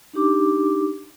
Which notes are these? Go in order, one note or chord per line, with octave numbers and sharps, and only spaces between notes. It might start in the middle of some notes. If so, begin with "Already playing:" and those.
D4 D#4 G4 D6